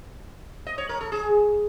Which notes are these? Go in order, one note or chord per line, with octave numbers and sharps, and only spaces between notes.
D#5
C#5
A#4
A4
G#4